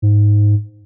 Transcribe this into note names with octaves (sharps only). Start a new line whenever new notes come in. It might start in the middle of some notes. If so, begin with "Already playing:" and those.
G#2